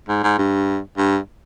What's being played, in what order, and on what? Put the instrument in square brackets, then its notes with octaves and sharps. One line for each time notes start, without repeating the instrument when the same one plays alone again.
[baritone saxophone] G#2
G#2
G2
G2